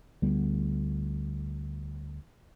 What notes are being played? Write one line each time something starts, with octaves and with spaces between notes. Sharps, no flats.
D2 G3 B3